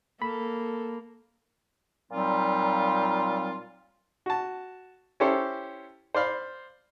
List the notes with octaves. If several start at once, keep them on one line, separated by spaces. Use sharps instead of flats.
A#3 A4 B5
A#2 F#3 G3 C4 D#4 F4
F#4 A5
C#4 E4 G4 A4 C5
C5 D5 F5 B5